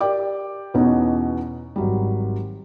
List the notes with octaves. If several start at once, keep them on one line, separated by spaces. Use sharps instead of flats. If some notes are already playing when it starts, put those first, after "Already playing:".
G4 A#4 D5 G5 D6
E2 B2 B3 C#4 D#4
G#1 F#3 G3